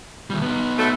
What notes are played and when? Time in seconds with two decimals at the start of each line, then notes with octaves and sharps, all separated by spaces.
0.30 D#2 G3
0.42 B3 D#4
0.79 B2 F#3 A3